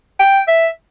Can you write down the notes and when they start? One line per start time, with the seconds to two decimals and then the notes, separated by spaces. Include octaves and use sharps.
0.19 G5
0.48 E5